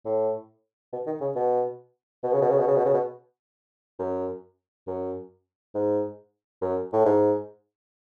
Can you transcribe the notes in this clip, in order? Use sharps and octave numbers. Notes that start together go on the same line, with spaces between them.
A2
B2
D#3
C#3
B2
B2
C#3
B2
C#3
B2
C#3
B2
C#3
B2
F#2
F#2
G#2
F#2
A2
G#2